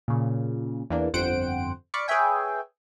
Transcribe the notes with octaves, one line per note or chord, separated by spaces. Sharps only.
A#2 C#3
E2 E3 A#3 D4
G1 F2 C5 F#5 G5 D7
D5 F5 B5 C#6 D6 C#7
G#4 B4 C#5 E5 G5 G#5